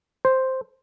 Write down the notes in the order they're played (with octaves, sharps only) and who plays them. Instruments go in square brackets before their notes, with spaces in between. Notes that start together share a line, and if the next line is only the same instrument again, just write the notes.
[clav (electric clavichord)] C5